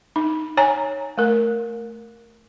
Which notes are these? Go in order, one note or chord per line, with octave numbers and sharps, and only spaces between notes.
D#4
C#5 G#5 A#5
A3 A#4